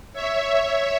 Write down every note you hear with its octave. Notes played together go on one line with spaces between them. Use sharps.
C#5 E5